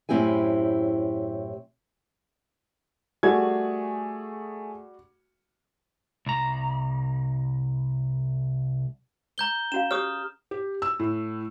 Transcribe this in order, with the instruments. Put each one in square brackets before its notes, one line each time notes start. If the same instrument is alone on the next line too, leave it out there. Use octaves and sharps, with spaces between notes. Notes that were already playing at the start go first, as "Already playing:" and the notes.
[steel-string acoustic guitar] F#2 A2 C4 E4 G4 G#5
[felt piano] G3 F#4 [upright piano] A3 G#4 G#6
[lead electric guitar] C2 A#5
[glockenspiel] A#5 G6 G7
[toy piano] C#4 F#4 F5 [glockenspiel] E7
[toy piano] G4 G#4 C#5 [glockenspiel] D#6 F6
[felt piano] G4
E6
A2